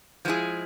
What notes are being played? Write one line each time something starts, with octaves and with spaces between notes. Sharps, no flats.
F3 G#3 B3 E4 G#4